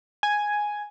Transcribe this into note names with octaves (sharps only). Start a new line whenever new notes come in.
G#5